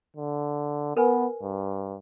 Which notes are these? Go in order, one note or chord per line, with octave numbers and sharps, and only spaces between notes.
D3
B3 A#4 B4 G#5
G2